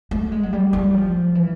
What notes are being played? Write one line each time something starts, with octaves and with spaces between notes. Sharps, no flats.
A3
G#3
F#3
G3
G3
F3
E3